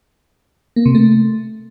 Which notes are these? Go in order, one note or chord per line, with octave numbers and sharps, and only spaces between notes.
A#3
C3
A3